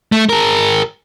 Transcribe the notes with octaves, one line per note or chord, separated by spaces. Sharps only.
A3
G#4 A#4